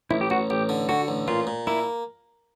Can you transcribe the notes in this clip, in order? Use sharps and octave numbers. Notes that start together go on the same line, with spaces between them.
A1 E4
G4
A1 F#4
A1 G4
D3
D3 F#4
A1
A#2 F4
A#2
A#3 E4